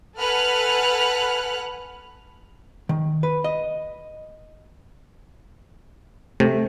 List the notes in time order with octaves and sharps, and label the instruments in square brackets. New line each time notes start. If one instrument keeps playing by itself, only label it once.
[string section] A4 B4 F#5 G#5 F6 F#6
[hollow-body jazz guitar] D#3
B4
D#5
[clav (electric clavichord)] C3 [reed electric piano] A3